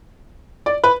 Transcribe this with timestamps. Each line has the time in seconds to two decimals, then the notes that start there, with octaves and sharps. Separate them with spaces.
0.66 D5
0.84 B4